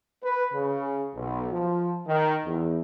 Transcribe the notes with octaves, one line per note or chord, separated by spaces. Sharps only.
B4
C#3
B1
F3
D#3
E2